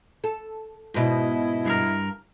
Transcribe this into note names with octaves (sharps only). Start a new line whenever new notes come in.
A4
G#2 B2 E4 D#5
G2 G#4 A#4